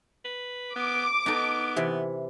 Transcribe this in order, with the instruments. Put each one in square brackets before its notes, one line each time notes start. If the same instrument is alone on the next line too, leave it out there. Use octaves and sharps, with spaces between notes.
[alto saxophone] B4
[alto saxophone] B3 [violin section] D6
[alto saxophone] B3 [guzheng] D#4 A4
[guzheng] C3 E3